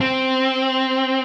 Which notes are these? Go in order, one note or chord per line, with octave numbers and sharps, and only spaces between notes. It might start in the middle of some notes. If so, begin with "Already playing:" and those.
C4